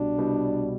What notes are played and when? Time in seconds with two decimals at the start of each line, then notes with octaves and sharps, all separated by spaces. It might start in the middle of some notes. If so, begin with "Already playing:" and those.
Already playing: C2 B2 G3 D4
0.18 C2 B2 G3